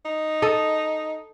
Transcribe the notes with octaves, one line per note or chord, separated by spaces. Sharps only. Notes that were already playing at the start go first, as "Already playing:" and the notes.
D#4
A4 D#5